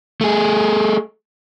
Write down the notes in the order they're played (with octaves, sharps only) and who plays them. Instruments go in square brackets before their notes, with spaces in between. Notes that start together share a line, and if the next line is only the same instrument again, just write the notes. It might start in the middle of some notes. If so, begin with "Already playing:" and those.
[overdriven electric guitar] A3 G#4